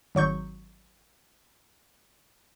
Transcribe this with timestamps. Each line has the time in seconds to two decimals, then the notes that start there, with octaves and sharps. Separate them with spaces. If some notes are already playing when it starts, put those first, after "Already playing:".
0.15 G#1 F#3 C#6 G6